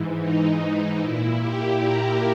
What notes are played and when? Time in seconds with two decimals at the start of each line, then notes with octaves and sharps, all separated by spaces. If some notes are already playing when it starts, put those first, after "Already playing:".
Already playing: G#2 E3
0.19 D#4
1.00 A#2 E4
1.41 G4
1.82 A#4